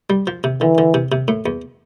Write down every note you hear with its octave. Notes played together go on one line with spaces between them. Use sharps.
G3
F3
C3
D3 E3
D3
C3
C3
A2
E2